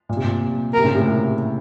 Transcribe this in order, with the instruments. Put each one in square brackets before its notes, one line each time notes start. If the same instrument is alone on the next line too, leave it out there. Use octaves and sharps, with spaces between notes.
[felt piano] A#2
C3
A#2
[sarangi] A#4
[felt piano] C3
A#2 C#3
A2 C3